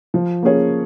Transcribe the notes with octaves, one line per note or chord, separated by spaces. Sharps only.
F3
A#3 C#4 G#4 C#5